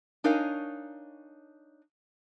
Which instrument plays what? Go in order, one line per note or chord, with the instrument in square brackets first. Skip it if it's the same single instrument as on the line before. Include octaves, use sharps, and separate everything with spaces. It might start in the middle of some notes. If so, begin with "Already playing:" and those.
[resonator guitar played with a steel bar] D4 D#4 A#4 C#5 F5 G#5